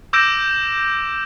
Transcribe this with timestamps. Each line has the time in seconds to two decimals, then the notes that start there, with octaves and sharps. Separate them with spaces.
0.13 D6 E6 G6 A#6 D7 E7